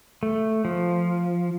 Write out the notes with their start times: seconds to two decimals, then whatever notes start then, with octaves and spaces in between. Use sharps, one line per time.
0.23 A3
0.65 F3